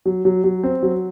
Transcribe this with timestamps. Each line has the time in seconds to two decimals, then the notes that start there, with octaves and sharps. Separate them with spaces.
0.06 F#3
0.25 F#3
0.44 F#3
0.63 C4
0.83 F#3